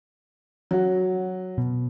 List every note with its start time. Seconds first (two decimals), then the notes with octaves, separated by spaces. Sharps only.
0.71 F#3 F#4
1.58 B2